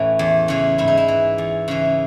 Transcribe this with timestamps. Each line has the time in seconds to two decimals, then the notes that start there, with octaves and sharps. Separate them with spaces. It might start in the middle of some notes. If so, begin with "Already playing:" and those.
Already playing: A2 E3 C#4
0.19 E2
0.48 C#3 E3
0.78 G#2 E4
0.88 D#4
0.97 E4
1.08 E3
1.38 E2
1.68 C#3 E3